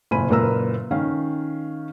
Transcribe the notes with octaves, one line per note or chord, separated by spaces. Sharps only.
F#1 A#2 G#5 B5 D#7
F#1 A#2 A#4 B4 A#5 E6
D#3 C#4 F5